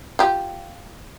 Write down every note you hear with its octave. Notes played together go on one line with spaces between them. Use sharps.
F4 G4